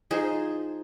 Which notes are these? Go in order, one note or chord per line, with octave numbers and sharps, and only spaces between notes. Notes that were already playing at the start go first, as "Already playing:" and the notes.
F3 D#4 G#4 C5